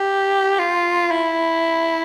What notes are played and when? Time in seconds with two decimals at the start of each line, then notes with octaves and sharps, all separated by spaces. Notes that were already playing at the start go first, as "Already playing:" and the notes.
Already playing: G4
0.59 F4
1.11 E4